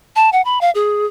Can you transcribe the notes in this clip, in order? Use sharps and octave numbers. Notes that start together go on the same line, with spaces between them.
A5
F#5
B5
F5
G#4